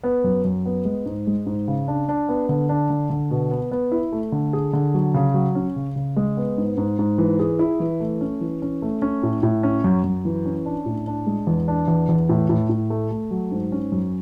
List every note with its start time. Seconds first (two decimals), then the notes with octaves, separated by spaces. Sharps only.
0.03 B3
0.24 F#2
0.45 F#2
0.66 B3
0.85 G#3
1.06 G#2
1.27 G#3
1.46 G#2
1.68 C#3
1.88 D4
2.09 D4
2.29 B3
2.49 D3
2.69 D4
2.90 D3
3.10 D3
3.31 B2
3.51 B3
3.71 B3
3.91 E4
4.12 A3
4.32 D3
4.53 G#4
4.73 D3
4.94 F#3
5.14 C#3
5.34 F#3
5.55 C#4
5.76 C#3
5.96 C#3
6.16 G#3
6.37 B3
6.58 G#2
6.77 G#2
6.99 G#2
7.18 E3
7.39 G#4
7.59 E4
7.80 E3
8.00 A3
8.21 C#4
8.41 E3
8.62 C#4
8.82 A3
9.02 C#4
9.23 A2
9.43 A2
9.63 C#4
9.84 F#2
10.04 F#2
10.25 E3
10.45 C#4
10.66 D4
10.86 A2
11.07 D4
11.27 G#3
11.47 E2
11.68 D4
11.88 E2
12.09 E2
12.29 A2
12.49 A2
12.69 A2
12.90 A3
13.11 A3
13.31 F#3
13.52 G#2
13.72 C#4
13.92 F#2